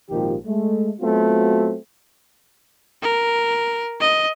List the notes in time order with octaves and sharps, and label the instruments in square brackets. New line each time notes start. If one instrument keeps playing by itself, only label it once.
[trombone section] G#1 A#2 D#3 F3 G4
G#3 A3
F#3 A3 B3 C4 F4 F#4
[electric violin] A#4
D#5